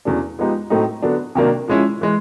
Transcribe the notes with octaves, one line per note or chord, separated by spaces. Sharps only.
E2 C#3 F#3 A3 D4
F3 G#3 B3 D#4 G4
A2 F#3 A3 C4 D#4
D3 F#3 B3 D4
C3 D#3 F#3 A#3 D4
F3 G#3 C#4 E4
E3 G#3